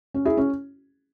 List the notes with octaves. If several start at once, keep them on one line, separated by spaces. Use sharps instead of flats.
C#4
E4 G#4
C#4